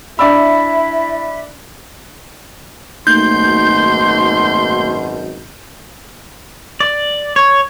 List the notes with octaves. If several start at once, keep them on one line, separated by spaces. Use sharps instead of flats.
D4 E4 D5 E5 B5 E6
G#1 F#2 B2 A3 A#3 D#4 C6 G6
D5
C#5